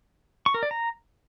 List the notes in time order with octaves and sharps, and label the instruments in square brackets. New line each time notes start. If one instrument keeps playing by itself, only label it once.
[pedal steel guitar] C#6
A#4
D5
A#5